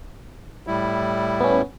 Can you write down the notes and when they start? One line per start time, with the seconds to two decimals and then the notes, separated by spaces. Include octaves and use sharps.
0.67 A2 G3 E4
1.40 B3 C#4